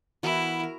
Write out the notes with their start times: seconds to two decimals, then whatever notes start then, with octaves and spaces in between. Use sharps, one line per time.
0.23 E3 B3 E4 F#4 A#4
0.63 A#4